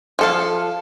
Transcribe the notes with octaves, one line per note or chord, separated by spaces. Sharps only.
F3 A4 F5